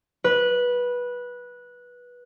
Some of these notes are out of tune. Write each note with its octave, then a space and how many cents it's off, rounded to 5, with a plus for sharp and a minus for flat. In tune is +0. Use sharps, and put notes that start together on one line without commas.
B4 -15